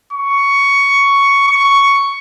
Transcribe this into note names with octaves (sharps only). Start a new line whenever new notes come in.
C#6
C#6